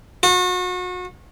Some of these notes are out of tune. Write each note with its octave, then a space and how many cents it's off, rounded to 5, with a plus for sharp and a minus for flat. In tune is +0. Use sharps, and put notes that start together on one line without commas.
F#4 -35